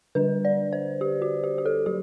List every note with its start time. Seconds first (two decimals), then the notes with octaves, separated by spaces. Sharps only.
0.15 D3 G3 D4 B4
0.45 D5
0.73 C5
1.01 G4
1.22 F#4
1.44 G4
1.58 G4
1.66 A4
1.86 F#3 G4